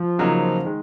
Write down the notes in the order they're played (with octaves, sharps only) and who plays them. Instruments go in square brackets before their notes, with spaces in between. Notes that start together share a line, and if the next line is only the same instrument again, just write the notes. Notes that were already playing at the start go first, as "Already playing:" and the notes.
Already playing: [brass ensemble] F3
[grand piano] C#3 F#3 A#3 D#4
D#3 G#3